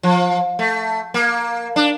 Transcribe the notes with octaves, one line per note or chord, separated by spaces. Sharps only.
F3
A3
A#3
D4